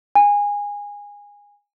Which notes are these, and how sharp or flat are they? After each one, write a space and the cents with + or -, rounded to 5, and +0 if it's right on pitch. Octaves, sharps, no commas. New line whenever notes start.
G#5 -20